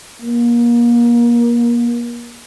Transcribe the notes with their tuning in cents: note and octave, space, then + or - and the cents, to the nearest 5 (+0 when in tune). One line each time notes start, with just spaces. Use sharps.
A#3 +30